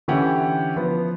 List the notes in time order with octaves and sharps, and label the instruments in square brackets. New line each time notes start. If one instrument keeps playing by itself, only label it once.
[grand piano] D3 E3 C#4 G4 F#5
F3 B3